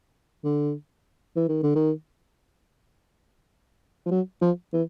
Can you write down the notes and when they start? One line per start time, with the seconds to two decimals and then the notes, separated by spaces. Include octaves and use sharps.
0.44 D3
1.36 E3
1.49 D#3
1.63 D3
1.75 D#3
4.06 F3
4.11 F#3
4.41 F3
4.73 E3